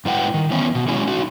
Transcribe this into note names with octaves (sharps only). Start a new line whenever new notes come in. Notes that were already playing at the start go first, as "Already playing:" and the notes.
G#2 G3 E4 B4 F#5 G5
D#3
E3 B3 C#4
B2
F#3 G#3 C#4 E4 F#4 G#4
D#4 F#4